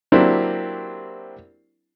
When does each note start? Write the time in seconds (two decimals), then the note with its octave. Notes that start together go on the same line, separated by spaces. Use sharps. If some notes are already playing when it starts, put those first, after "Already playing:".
0.12 F#3 A#3 C4 D4 E4 G4